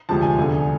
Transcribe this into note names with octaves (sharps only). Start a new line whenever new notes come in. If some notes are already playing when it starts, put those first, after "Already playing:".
D2 C3 F3 G#3 A5
G#5
E1 D2 D3